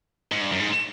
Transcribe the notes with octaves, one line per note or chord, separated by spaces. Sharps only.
G#2
G2
F#2
G#2